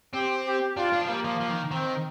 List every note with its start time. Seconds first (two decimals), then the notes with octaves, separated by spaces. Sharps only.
0.13 C4 G4
0.46 G4
0.77 D4 F4
0.93 D4
1.01 F3
1.08 G3 A#3
1.24 F3
1.41 F3
1.51 D#3
1.71 D#3 C4